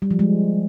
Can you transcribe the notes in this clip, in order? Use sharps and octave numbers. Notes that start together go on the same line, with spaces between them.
G3
F3
G#3